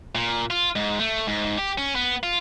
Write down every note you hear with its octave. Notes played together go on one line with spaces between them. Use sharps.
A#2
F4
G#2
A3
G#2
G4
C#4
B3
F4